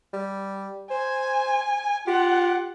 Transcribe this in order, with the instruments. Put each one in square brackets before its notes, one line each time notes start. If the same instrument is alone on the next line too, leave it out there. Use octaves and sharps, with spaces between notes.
[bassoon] G3
[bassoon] C5 [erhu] G#5
[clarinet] F4 [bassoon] G4 [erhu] F#5